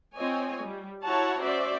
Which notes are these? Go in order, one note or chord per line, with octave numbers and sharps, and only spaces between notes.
C4 F4 C#5 D#5 G#5
G3
E4 F#4 C#5 F#5 A5 A#5
C#4 F#4 C5 D5 E5